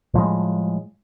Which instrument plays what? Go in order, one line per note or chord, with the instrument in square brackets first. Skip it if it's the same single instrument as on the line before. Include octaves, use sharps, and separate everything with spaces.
[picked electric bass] A2 F3 G3 G#3